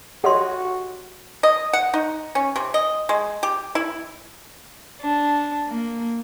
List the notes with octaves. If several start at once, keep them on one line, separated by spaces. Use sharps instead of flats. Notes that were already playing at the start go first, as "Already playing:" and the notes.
F#4 G4 C#5 D#5 F#5 C6
D#5
F#5
D#4
C#4
C3
D#5
G#3
G4
E4
D4
A#3